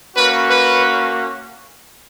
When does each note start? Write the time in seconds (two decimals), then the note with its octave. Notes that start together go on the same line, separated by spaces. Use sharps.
0.15 A#3 C#4 F#4 B4
0.49 B4